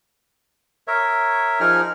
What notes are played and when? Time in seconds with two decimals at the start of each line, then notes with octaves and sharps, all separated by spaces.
0.88 A#4 C#5 E5
1.60 F3 D#4 G#4 A#4 F6